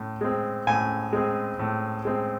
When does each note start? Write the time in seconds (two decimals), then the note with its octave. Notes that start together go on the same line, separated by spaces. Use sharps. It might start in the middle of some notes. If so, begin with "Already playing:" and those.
Already playing: A2
0.21 G#3 C4
0.67 A2 G#5
1.13 G#3 C4
1.59 A2
2.05 G#3 C4